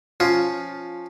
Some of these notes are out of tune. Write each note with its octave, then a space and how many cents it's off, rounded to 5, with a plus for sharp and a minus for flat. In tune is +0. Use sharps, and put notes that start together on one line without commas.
F3 +5 C#4 +0 F4 +0